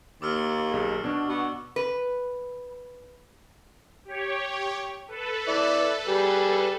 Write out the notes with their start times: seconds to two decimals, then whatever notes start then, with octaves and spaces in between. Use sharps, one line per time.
0.22 D#2 A#3 D6 E6 F6
0.72 B1 G#4
1.04 B2 D4 F#4
1.29 B3 F#4
1.76 B4
4.05 G4 C#5
5.08 A4 B4
5.48 E4 D5
6.07 G3 G#4